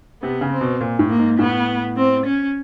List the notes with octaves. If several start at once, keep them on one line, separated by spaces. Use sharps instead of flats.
C3 B3
C#3
C4
B2
A#2
A2
A#3
G#2
A2 B3
C4
C#4